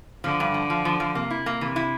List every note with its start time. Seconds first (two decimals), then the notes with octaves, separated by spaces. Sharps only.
0.24 D3 F3
0.40 G2
0.54 F3
0.70 F3
0.85 F3
1.00 F3
1.15 C3 A#3
1.30 E4
1.46 A#3
1.61 C3 E3
1.76 E4